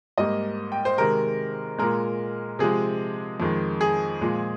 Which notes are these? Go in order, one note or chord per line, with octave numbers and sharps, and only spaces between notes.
G#2 G3 A#3 D#5
G5
C5
C3 D#3 G#3 A#4
A#2 G#3 A#4
C3 F3 G#3 G#4
F2 D#3 G#3
G#4
A#2 F3 G#3